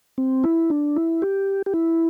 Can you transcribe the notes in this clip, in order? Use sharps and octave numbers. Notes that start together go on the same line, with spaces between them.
C4
E4
D4
E4
G4
G4
E4